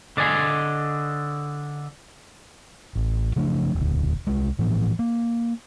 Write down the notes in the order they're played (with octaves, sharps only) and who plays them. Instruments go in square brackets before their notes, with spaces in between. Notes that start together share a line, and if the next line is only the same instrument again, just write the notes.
[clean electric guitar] D3 D5 D#5 G#5
[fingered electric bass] A1
C#3 F3 A3 D4
E1 D2
C2 G#3
A2 E3 F3 B3
A#3